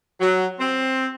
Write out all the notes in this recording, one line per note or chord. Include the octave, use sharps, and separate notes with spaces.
F#3
C4